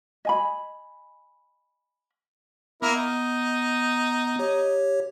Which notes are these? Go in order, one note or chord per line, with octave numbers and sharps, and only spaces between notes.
D#5 G#5 B5
A#3 B3 E4
D#4
G4 C#5